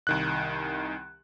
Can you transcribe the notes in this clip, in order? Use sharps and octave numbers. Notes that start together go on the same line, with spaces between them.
C2 D#3 F#6